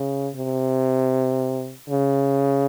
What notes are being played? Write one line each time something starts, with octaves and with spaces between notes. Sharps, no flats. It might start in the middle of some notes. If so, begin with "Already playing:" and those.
Already playing: C#3
C3
C#3